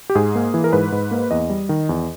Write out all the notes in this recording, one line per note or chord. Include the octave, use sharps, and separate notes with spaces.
G4
G#2 G#4
A#3
E3
A#4
G#2 B4
G#2
A#3
E2 D#5
G3
D#3
E2